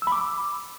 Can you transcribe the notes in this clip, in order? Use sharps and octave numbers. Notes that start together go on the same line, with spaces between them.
E6
B5
D6